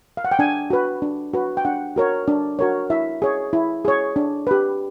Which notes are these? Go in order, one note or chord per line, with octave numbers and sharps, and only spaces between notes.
F5
F#5
G5
D4 G#5
F#4 B4
D4
F#4 B4
G5
D4 F#5
F#4 A#4 C#5
D4
F#4 A#4 C#5
E4 E5
G#4 C#5
E4
G#4 C#5
D4
G4 B4